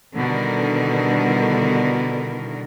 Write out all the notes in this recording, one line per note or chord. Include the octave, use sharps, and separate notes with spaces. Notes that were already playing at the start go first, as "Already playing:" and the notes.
B2 D3 D#3 G3 E4 A#4